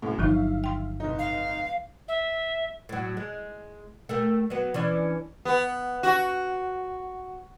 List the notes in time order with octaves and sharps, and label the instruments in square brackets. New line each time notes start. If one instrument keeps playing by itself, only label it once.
[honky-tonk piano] C2 F#2 A2
[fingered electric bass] G1 D#3 [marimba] F3 F#3 D#4 [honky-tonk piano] E5 F5
[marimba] G5 C6
[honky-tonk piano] F1 D#4
[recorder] F5
E5
[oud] A2 F#3
G#3
A3 G4 A#4
F#3 B3
E3 C#4 D4
[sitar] B3
F#4